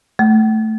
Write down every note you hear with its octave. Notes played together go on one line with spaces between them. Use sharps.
A3